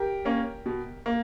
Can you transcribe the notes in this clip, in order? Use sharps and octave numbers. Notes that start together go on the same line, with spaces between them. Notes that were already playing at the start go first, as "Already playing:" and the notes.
Already playing: G4 A#4
A#3 C#4
B2
A#3